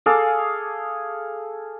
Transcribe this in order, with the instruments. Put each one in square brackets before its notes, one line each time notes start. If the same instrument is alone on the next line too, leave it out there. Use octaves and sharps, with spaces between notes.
[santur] G#4 A4 F5 D6